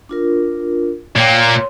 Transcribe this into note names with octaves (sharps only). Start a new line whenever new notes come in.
D4 F4 A#4
A#2 A#3 C#5 G5
C#5 C6